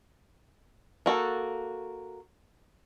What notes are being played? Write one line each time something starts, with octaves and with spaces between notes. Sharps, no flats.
A#3 F#4 A4